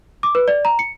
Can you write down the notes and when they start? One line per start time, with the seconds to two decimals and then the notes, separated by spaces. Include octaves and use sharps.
0.23 D6
0.35 B4
0.48 D5
0.65 A#5
0.79 C#7